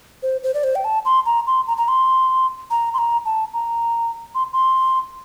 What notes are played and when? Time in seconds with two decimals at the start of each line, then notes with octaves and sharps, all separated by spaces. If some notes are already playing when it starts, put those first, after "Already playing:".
0.23 C5
0.43 C5
0.54 D5
0.64 C5
0.75 G5
0.85 A5
1.05 C6
1.26 A#5
1.47 C6
1.67 A#5
1.77 A#5
1.88 C6
2.71 A#5
2.94 C6
2.98 A#5
3.25 A5
3.54 A#5
4.35 C6
4.53 C6